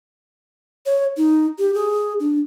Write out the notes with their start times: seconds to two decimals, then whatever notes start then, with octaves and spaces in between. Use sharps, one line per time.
0.86 C#5
1.17 D#4
1.59 G4
1.74 G#4
2.20 D4